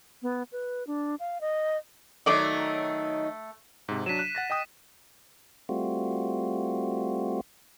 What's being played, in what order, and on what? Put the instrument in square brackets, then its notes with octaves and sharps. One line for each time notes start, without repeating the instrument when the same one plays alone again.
[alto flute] B3
B4
D4
F5
D#5
[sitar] D#3 F#3 D#4 [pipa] A3 D5 D#5
[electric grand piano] G#2 C3
[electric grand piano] F#3 D4 [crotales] B6 D#7 E7
[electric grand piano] F#6
F#5 A6 A#6
D#5 G5 D#6
[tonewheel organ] G3 A3 C4 F4 F#4